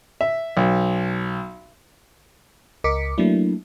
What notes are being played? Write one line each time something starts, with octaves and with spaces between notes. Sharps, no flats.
E5
B1
C#2 A#4 D#5 D6 B6 C#7
F#3 A3 A#3 D4 E4